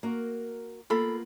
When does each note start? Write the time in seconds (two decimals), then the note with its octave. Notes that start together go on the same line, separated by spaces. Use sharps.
0.03 A#3 F#4 A#4
0.90 A#3 B3 F4 A4 B5